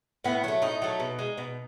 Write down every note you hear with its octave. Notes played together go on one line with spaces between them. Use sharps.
A2 B3
F#3 A3 C#4
A2 D#4
F#3 A3
B2
G#3
B2